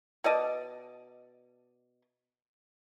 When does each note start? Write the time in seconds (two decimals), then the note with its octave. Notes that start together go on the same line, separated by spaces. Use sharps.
0.24 B2 D5 D#5 A5